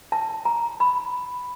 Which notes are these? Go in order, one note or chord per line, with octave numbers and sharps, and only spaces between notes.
A5
A#5
B5